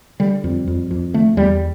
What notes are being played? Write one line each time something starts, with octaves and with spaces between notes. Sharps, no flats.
D3 G3
F2
F2
F2
D3 A3
E2 G3